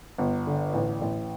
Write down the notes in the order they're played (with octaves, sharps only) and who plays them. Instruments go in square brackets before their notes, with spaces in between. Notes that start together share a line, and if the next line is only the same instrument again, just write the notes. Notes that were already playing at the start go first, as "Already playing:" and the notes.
[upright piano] G1
D3
A1
A1